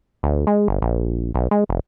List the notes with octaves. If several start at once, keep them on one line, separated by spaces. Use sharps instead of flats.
D2
G#3
G1
A#1
B1
G#3
F1